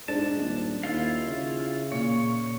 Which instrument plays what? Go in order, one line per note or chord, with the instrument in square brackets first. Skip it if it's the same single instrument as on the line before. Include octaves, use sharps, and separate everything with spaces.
[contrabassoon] G#2 [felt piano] D4 [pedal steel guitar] A5
[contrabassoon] D#1
[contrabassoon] D#2 [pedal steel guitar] E4 F4 F5
[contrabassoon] C#3
[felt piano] A#2 [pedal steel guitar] C#5